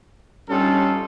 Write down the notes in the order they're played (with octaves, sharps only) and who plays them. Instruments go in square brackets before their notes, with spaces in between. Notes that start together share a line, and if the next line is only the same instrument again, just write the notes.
[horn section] G2 G3 C#4 D#4 F4 A4